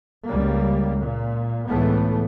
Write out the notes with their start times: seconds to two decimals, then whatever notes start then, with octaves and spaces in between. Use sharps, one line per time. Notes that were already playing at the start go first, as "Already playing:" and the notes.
0.25 C#2 G3 A#3
1.00 A#2
1.67 C#2 A2 E3 A3 B3